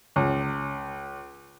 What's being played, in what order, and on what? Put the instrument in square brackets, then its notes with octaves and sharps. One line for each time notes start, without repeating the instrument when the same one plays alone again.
[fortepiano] C#2